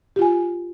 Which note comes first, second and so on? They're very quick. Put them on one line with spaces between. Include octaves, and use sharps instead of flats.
G4 F4 G#5